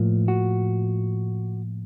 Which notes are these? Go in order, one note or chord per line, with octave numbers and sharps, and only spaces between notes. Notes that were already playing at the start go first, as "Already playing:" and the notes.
Already playing: A2 F3 A#3
F#4